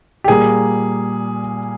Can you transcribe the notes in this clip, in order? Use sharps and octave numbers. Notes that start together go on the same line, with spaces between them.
G4
A#2 G3 A#3 G#4